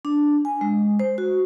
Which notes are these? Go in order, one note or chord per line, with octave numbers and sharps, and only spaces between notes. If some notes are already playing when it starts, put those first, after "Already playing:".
D4
G#5
G#3
C5
F#4